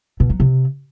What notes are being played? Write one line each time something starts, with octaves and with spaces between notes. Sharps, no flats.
B2
F#3
C3